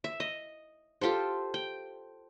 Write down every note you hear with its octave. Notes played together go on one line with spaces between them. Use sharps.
E5
D#5
F4 G4 A4 C5
G5